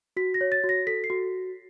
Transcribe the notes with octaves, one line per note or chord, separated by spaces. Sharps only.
F#4 B6
A#6
C#5
A6
F#4
A#6
A4 B6
C7
F#4